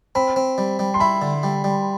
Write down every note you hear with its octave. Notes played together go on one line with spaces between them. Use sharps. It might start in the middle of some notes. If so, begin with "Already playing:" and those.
C4 B5
C4
G3
G3
C6
E4 B5
D3
G3
G3